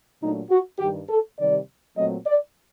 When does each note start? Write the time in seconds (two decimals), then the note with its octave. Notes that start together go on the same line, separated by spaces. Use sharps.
0.20 A#2 F#3 A3 D4 D#4
0.49 F#4
0.78 G2 D#3 G3 G4
1.08 A4
1.38 C3 D#3 G3 D5
1.96 A#2 F#3 A3 C4 D#5
2.26 D5